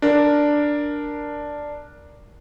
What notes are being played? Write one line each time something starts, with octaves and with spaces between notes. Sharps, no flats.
D4 A#4